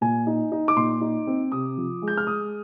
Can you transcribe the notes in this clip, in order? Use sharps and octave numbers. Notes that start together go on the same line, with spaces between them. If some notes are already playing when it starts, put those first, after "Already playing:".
A#2 G#5
D#4
D#4
D6
A#2 C6
D#4
C4
C3 D#6
F3
G#3
G6
F6
G#3 D#6